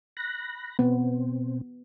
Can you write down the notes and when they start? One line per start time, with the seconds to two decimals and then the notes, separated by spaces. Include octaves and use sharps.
0.17 B5 F#6 A#6
0.79 B2 B3 C4